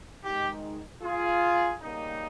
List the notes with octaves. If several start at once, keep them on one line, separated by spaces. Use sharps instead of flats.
G#2 D#3 G#3 D#4 G4
F4 G#4
C#3 G3 A#3 D#4